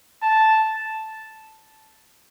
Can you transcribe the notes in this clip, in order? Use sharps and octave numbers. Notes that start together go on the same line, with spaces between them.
A5